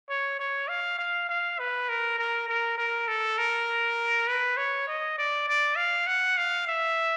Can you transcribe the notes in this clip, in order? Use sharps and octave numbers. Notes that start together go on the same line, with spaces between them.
C#5
C#5
F5
F5
F5
B4
A#4
A#4
A#4
A#4
A4
A#4
B4
C#5
D#5
D5
D5
F5
F#5
F5
E5